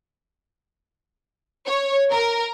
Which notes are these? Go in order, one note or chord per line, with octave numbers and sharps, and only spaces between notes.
C#5
A#4